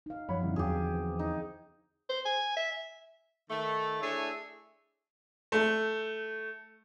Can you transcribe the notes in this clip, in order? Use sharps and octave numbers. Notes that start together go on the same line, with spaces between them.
D#4 F5
F#2 F3 C#5 F#5 B5
D3 D#3 G3 C4 E4
E2 F#3 G4 G#4
C5
D#4
C5
G#5
E5
D#3 A3
A3 D4 E4 G#4 C#5 E5
A3